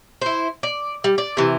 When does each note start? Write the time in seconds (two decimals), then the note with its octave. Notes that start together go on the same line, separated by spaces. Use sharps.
0.21 E4 C5
0.63 D5
1.04 G3
1.18 D5
1.37 C3 E3